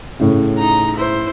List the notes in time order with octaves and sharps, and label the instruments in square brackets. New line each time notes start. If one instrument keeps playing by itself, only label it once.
[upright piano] A2 C#3
[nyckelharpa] D#4 A#5
E4 C5